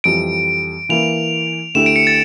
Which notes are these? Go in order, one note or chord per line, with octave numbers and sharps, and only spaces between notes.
F2 E3 G3 D7
E3 A#3 E4 A#4 F7
D2 D3 A3 E4 G4 E7
D7
C#7
A6